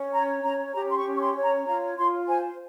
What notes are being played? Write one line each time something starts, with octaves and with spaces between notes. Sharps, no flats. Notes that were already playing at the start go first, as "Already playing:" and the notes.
Already playing: C#4
C#5 A#5
C#4 A#5
G4 A#5
C6
C#6
C#4
C#6
C6
C#5
A#5
F4 A#5
F4 C6
C5 G#5